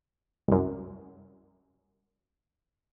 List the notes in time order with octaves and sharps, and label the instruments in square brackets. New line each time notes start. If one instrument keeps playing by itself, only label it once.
[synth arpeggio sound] C2 F#2